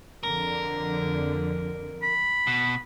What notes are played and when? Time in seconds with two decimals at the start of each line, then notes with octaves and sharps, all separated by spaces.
0.23 F2 D3 A#4
2.02 B5
2.47 B2